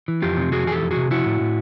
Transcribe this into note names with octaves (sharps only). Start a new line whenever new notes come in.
E3
F2 F4 G4
C3
F2 F#4 G#4
E3 G#4
G4 A4
F2
F#4 G#4
C3
F3 E4 F#4
A2
A2